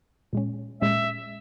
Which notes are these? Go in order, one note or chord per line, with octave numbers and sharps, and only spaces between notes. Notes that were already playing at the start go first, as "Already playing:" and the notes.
A#2 G#3 C#4
A#2 G#3 C#4 E5